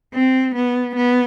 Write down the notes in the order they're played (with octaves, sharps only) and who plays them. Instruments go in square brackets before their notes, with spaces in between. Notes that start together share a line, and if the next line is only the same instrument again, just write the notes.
[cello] C4
B3
B3